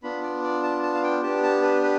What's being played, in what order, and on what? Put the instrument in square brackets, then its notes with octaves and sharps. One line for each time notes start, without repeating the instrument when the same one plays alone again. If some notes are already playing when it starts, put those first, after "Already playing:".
[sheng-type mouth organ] B3 D4 F4 B5
D5
D5
A5
A5
F5
G5
B3 D4 G4 A5
A5
B4
B4